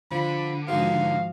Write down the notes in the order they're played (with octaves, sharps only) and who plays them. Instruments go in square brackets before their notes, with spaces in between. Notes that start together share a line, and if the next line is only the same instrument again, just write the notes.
[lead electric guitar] D3 [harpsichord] F3 [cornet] B5
[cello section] G#2 F3 F#4 [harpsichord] B2 D#3 G#3 [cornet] F5